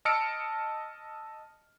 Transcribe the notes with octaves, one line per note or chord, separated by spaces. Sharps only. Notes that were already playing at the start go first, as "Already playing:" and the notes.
D#5 A5 E6 F6 C#7 D7